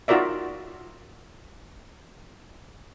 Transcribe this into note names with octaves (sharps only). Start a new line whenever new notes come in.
D#4 F4 F#4 A#4 D5 E5